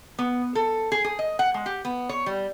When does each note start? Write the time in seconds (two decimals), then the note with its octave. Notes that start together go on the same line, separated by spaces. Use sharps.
0.19 B3
0.55 A4
0.92 G#4
1.05 G#4
1.19 D#5
1.39 F#5
1.54 G#3
1.66 G4
1.85 B3
2.09 C#5
2.26 G3